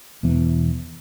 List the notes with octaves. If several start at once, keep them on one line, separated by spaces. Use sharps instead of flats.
E1 E2 E3 B3